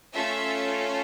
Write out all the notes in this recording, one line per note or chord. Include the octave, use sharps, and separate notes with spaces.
A3 C#4 F4 A4 E5